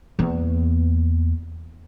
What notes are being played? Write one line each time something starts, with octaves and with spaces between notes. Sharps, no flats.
E2 A#3